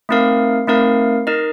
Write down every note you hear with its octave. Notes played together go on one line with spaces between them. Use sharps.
A3 C4 D#4 A#4 F5
A3 C4 D#4 A#4 F5
D#4 A#4 D#5